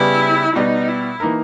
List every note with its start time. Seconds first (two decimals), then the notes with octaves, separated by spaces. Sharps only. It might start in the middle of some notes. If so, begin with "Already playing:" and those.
Already playing: C#3 G3 B3 E4 G4
0.56 B2 G3 B3 D#4
0.88 E4
1.20 E3 A#3 D#4 A#4